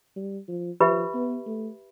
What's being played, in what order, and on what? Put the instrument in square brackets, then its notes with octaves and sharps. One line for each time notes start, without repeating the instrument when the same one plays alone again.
[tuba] G3
F3
[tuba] F3 [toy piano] G4 B4 E5 B5
[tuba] B3
A3